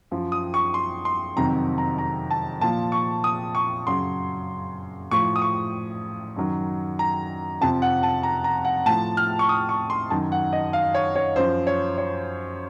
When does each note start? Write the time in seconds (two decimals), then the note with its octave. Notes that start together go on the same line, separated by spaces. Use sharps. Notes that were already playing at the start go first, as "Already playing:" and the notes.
0.11 F#2 F3
0.32 D#6
0.54 C#6
0.74 C6
1.05 C6
1.36 F2 C3 D#3 F#3 A#5
1.78 A#5
1.98 A#5
2.31 A5
2.61 A#2 F3 A5
2.92 C#6
3.24 D#6
3.55 C#6
3.87 F#2 C#3 F#3 C6
5.11 A2 F3 C#6
5.36 D#6
5.42 C#6
6.36 F#2 D#3 F#3
6.99 A#5
7.61 F2 C3 F3 A5
7.82 F#5
8.03 A5
8.23 A#5
8.44 A#5
8.65 F#5
8.86 A2 F3 A5
9.17 F6
9.39 C#6
9.49 D#6
9.69 C#6
9.90 C6
10.10 F#2 D#3 F#3 A5
10.32 F#5
10.53 D#5
10.73 F5
10.94 C#5
11.16 C#5
11.36 F#2 F3 C5
11.67 C#5
11.98 C#5